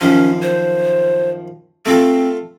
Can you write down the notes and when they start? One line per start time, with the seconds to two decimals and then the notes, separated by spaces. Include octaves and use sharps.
0.01 F#2 D#3 F3 C#4
0.42 C5
1.86 A3 C4 F4 A4